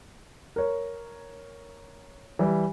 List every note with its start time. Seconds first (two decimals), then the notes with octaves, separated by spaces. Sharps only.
0.56 A#4 C#5
2.39 E3 G3